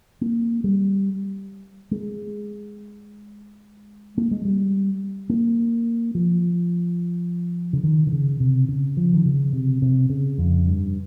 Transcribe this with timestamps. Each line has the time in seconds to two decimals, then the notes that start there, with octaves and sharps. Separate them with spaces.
0.21 A#3
0.64 G3
1.91 G#3
4.18 A#3
4.31 G#3
4.45 G3
5.30 A#3
6.15 F3
7.73 C#3
7.83 D#3
8.07 D#3
8.12 C#3
8.40 C3
8.68 C#3
8.97 F3
9.13 D#3
9.25 C#3
9.53 C3
9.82 C3
10.10 C#3
10.38 F2
10.66 G2